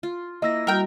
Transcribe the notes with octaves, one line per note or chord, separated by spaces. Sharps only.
F4
A#3 E4 D#5 E6 A#6
G3 F#4 A#4 G5